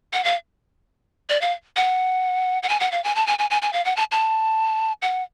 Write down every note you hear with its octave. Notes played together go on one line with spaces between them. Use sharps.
F#5
F5
D5
F5
F#5
F#5
G#5
F#5
F5
G#5
A5
G#5
G#5
G#5
G#5
F5
F#5
A5
A5
F#5